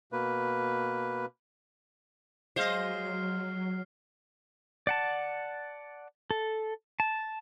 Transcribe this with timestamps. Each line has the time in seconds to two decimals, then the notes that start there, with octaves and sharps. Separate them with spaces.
0.12 B2 A#3 B4
2.56 F#3 G#3 C5 D#5 F5 F6 C7
4.87 D5 F#5 A5
6.31 A4
7.00 A5